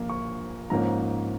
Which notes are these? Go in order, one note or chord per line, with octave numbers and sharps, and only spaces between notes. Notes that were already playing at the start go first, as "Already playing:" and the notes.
Already playing: A#1 A#2 A#3
C#6
G#2 F3 A#3 C#4 A#5